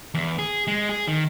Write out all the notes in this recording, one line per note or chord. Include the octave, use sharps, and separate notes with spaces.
E2
G#4
G#3
G#4
D#3